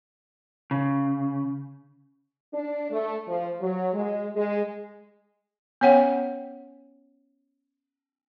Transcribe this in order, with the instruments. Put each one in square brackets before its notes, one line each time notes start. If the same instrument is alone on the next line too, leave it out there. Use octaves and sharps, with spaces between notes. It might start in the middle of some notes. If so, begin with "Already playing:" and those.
[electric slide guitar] C#3
[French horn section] D4
A3
F3
F#3
G#3
G#3
[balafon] B3 C#4 C#5 F#5 G5